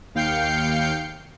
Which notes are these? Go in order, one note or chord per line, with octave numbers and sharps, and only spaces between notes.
D#2 F5 G5 G6 C7 C#7